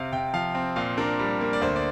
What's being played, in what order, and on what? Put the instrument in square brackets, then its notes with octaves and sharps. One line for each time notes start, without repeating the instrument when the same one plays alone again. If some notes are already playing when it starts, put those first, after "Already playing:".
Already playing: [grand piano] C3 C4 F5
C3 G5
F3 F5
C4
A#2 F5
D4 A#4
G3
A#3
D5
D2 C5
D5